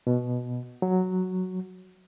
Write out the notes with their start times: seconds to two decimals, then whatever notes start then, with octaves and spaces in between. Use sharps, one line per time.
0.07 B2
0.82 F#3